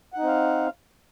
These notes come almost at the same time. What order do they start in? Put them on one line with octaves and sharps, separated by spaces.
F#5 D#4 C4 F5